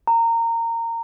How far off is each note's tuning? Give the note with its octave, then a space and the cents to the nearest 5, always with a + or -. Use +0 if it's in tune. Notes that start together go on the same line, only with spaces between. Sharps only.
A#5 -20